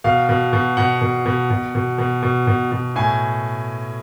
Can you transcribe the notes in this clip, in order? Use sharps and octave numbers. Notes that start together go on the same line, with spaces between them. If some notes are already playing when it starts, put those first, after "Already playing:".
B2 F5
B2
B2
B2 F#5
B2
B2
B2
B2
B2
B2
B2
B2
A2 G#5